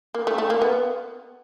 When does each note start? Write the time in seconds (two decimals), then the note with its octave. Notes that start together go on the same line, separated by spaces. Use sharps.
0.14 A#3
0.27 A3
0.38 A3
0.50 A#3
0.62 B3